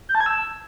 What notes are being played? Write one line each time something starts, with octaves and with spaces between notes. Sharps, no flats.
G6
A5
G#6
E6